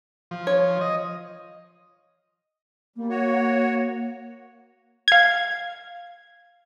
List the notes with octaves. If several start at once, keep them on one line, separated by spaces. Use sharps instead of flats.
F3
C#5
D#5
G3 A#3
F#4 C#5
F5 G#6